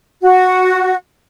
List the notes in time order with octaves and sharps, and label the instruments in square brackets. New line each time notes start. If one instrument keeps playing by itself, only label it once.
[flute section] F#4